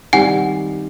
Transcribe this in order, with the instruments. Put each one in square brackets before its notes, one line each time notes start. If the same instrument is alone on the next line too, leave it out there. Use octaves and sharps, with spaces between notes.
[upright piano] D#3 G3 C4 [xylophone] F#5 G#5